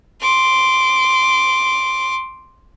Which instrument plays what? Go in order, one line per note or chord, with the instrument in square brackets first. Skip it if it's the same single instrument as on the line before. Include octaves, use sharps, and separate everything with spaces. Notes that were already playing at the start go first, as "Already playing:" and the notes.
[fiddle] C6 D6